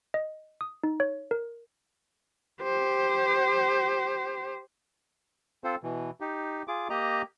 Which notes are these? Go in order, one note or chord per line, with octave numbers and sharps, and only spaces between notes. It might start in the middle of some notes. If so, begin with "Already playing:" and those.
D#5
D#6
D#4
C#5
A#4
G4 C5
C4 F4 A4 C5
B2 E3
D#4 G4
F4 G#4 D6
A#3 G4 D#5 A#5